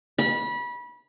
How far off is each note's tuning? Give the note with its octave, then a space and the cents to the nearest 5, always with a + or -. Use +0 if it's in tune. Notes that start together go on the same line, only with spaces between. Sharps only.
B5 -25